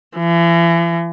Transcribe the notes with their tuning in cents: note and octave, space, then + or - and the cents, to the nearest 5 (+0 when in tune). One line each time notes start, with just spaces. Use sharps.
E3 +40